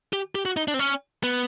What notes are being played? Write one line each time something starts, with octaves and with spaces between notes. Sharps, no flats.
G4
G4
F#4
D#4
D4
C4
C#4
B3